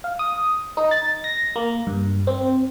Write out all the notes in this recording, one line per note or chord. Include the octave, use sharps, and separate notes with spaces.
F5
D#6
D#4
A6
A#6
A#3
G2
C4